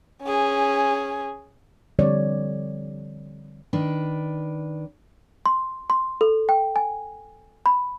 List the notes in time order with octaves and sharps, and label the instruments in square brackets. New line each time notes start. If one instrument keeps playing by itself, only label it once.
[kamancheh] C#4 G#4
[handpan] D3 F3 G3 C4 C#5 D5
[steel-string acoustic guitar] D#3 D4 B4
[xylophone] C6
C6
A4
G5
G#5
B5